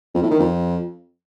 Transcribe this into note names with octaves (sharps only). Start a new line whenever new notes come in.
F2
A2
D#3
F2